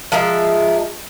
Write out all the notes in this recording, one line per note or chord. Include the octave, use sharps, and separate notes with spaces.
F3 G#3 A#4 E5